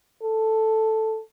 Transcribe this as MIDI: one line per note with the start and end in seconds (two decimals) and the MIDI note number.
0.23 1.20 69